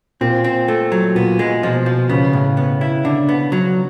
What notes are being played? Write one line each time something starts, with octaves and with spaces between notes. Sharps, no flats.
A#2 C4
C4
A3
F#3
A#2 B3
G#3
B2 F3
F3
C#3 B3
A2
B3
E4
D3
B3
F#3